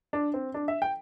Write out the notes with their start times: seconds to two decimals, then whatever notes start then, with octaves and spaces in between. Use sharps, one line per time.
0.13 D4
0.34 C4
0.54 D4
0.68 E5
0.82 G5